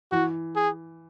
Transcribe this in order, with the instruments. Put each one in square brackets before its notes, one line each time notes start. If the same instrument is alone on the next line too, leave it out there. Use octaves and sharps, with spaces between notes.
[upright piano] E3 [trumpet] F#4
[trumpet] G#4